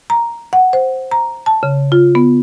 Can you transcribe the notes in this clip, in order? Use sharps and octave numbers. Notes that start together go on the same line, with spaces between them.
A#5
F#5
C5
A#5
A5
C#3
F4
B3